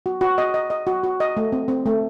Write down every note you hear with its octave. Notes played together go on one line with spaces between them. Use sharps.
F#4
F#4
D#5
D#5
D#5
F#4
F#4
D#5
A3
C4
C4
A3